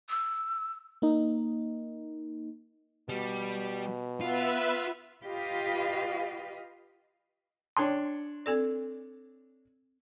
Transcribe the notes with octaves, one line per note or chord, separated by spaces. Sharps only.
E6
A#3 D#4
B2 G3
B3 F4 B4 E5
F4 G4 B4 D#5 F5
D4 C#5 G5 C6
C4 A4 D5